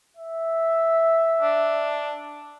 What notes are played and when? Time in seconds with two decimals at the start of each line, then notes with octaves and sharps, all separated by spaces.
0.17 E5
1.42 D4